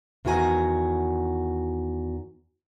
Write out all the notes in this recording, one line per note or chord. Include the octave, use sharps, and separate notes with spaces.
E2 D#3 F#4 B4 G#5 A#5